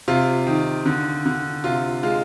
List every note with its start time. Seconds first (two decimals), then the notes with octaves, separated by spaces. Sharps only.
0.08 C3 F4
0.46 D#3
0.86 D3
1.26 D3
1.64 C3 F4
2.03 G#3 F4